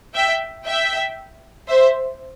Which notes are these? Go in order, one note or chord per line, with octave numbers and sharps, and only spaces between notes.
E5 G5
E5 G5
C5 E5